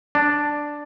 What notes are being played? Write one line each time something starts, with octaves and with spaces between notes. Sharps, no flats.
D4